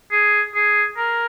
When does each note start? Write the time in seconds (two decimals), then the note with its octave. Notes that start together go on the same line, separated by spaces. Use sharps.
0.12 G#4
0.55 G#4
0.97 A#4